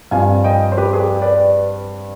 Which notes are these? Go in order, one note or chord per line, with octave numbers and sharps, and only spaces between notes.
G2 F3 C4 F5 G#5
D#5 G5
C5
G4 B4
G#4
G4
B4 D5